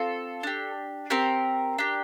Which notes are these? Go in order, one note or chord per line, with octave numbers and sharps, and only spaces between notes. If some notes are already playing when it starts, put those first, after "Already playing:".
Already playing: C4 F4 A4
D4 G4
C4 G4 A#4
D4 G4